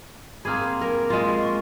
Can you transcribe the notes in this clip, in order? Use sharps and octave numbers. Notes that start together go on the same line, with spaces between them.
A#3 C4 G#4 B5 D6 F6
A#4
G#3 F4 C6 F6
C#6